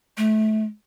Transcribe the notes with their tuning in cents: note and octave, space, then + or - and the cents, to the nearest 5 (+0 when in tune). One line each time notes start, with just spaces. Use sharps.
A3 -25